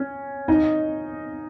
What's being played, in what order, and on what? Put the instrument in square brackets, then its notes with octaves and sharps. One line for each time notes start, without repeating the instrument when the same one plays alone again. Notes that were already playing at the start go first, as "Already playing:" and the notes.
Already playing: [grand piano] C#4
D#4 D#5